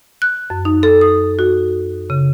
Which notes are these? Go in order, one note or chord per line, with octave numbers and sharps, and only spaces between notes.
F#6
F#2
D#4
A4
D#6
F#4
C#3